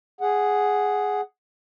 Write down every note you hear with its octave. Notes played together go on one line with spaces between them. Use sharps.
G#4 F#5